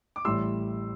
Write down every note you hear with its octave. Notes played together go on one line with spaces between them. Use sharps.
D6
A1 A2 G3 C6 E6